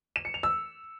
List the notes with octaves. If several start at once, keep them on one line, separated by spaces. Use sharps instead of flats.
E7
C#7
F7
E6